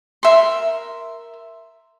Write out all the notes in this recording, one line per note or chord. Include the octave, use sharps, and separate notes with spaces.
A#4 E5 C6